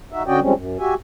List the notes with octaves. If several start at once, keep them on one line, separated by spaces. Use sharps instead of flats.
D#4 F#4 E5
D3 C#4 F#4 D5 D#5 G5
F3 G3 G#3 C4 C#4
F#2
F#4 G4 E5 G#5